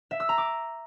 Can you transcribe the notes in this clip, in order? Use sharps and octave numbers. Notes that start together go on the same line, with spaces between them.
E5
E6
A#5
D6